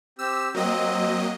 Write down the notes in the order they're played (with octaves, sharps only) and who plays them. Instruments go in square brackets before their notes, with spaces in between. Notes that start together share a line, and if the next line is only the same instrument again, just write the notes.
[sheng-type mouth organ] C4 G4 [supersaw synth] E6
[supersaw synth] F#3 A#3 D#5 [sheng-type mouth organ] C4